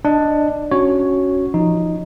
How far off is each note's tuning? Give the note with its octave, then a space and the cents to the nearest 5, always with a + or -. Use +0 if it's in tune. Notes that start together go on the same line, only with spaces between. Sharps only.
D4 +10 D#5 +0
C#4 +0 F#4 +0 C#5 +0
F3 -20 D#4 +0